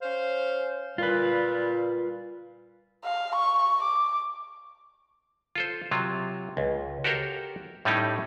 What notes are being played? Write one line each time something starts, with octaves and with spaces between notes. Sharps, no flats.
C#4 C5 F5
A#2 G3 F4 B4
F5
C#6
D6
F4 A4 C5
C3 F#3 F4
C#2
F#4 G4 A4 A#4 C5 C#5
A2 G3 A3 C#4 D#4 G4